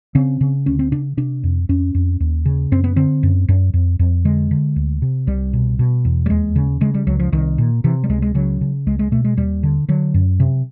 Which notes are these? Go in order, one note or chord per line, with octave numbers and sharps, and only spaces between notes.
C#3 C4
C#3
D2 C#4
C4
C#3 D4
C3 D4
F2
F2 C#4
F2
D#2
C#3
F#2 C4
B3
D3 C4
F#2
F#2
F2
F2
D3 G#3
D3
D2
C3
C2 G3
B2
B2
E2
G3
D#2 G#3
C#3
C#3 G#3
G3
C#2 F#3
F3
C2 D#3
A#2
C3 E3
G3
C#2 G#3
G#3
C#3 F#3
C#3
C#2 G#3
G#3
B2 A3
G#3
D#2 G3
D3
D3 F#3
F#2
C3